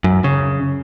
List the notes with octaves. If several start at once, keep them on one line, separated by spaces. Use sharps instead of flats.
F#2
C#3